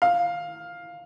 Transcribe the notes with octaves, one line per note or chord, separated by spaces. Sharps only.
F5